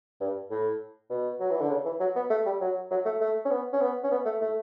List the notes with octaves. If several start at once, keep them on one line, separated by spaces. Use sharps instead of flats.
G2
A2
B2
F#3
E3
D3
C#3
E3
F#3
B3
A3
G3
F#3
F#3
A3
A3
C#4
B3
C#4
B3
C#4
B3
A3
A3